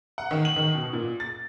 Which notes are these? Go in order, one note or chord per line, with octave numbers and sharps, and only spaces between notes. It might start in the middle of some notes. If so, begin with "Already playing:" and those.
F#5
D#3
F#7
D#3
B2
A#2
A6